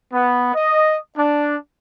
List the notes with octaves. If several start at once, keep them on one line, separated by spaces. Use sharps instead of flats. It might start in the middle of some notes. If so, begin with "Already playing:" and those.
B3
D#5
D4